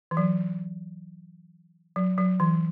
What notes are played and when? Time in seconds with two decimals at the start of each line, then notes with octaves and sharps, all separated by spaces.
0.11 E3
0.17 F#3
1.96 F#3
2.18 F#3
2.40 E3